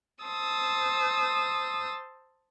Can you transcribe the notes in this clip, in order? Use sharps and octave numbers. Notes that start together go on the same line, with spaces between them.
C5 A5 D#6 E6